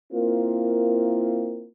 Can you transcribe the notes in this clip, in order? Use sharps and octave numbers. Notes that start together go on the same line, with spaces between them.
A#3 C4 E4 F4 A#4